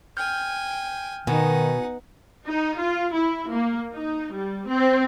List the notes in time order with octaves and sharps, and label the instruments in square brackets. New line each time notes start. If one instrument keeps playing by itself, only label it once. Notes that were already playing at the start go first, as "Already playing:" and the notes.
[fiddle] G5 G#5 [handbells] F6 G6
[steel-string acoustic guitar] B2 [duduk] D#3 [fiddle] D#4 F#5 [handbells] G#5
[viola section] D#4
F4
E4
A#3
D#4
G3
C4